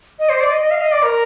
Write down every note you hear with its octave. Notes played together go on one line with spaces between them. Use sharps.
D#5
C5
D5
D#5
D#5
F5
D#5
D5
A#4